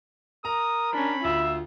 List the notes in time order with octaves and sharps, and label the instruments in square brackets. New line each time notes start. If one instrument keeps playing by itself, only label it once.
[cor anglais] A#4 [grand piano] A#5 [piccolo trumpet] D#6
[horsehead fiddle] C#4 D4 [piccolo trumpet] B5
[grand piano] D2 [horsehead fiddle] F4 [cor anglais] E5